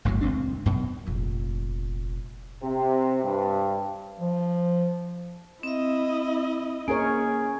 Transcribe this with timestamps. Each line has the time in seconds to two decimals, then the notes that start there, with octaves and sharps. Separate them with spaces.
0.05 G1 D2 A2 F#3
0.21 D#1 C#2 C4 D4
0.66 F#2 B2
1.07 F1 A#1
2.63 C3
3.23 G2
4.19 F3
5.63 C4 E4 D#5 E5
6.88 A#3 C#4 G#4 A#4 C#5